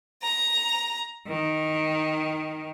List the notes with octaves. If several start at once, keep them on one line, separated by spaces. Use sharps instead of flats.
A#5
D#3